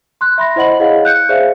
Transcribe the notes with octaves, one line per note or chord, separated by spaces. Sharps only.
C6 F#6
E5 B5 C6 A#6
E4 C5 D#5 F#5 B5 F#7
E4 G#4 C#5 D#5 F5 F#5
F#6 G6 C#7
G#4 C5 D5 E5 F5